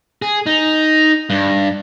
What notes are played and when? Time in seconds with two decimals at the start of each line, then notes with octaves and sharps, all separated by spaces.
0.22 G#4
0.46 D#4
1.30 G2